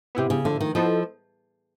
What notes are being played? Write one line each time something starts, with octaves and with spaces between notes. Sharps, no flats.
C3 B3 E4 G4
C#3
A2 D3 F3 A3
D#3
F3 B3 E4 A4 C5 D#5